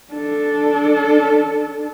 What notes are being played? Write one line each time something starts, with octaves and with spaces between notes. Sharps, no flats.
D4 A4